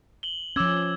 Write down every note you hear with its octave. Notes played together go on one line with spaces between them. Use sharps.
F#7 G7
F3 C#4 D6 E6 G#6